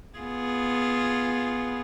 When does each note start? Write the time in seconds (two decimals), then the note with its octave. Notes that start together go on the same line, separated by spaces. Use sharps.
0.19 B3 F4 G#4